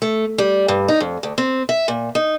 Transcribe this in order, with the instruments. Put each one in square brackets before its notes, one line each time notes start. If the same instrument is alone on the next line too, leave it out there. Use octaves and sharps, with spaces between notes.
[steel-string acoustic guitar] A3
G3
G2
D#4
F2
D2
C4
E5
A#2
D#4